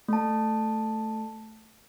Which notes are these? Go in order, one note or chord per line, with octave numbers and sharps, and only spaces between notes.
A3 A5